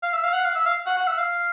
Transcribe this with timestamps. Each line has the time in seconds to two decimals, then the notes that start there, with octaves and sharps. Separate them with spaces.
0.03 F5
0.13 E5
0.23 F5
0.34 F#5
0.45 F5
0.55 E5
0.66 F5
0.86 F#5
0.97 F#5
1.07 E5
1.18 F5